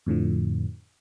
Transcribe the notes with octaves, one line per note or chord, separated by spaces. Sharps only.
F2 A2 D3 F3